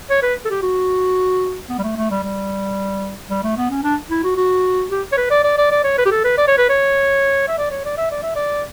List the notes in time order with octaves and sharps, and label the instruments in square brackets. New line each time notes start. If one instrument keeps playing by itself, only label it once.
[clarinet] C#5
B4
A4
G4
F#4
B3
G3
A3
A3
G3
G3
G3
A3
B3
C#4
D4
E4
F#4
F#4
G4
C#5
B4
D5
D5
D5
D5
C#5
B4
G4
A4
B4
D5
C#5
B4
C#5
E5
D5
C#5
D5
E5
D5
E5
D5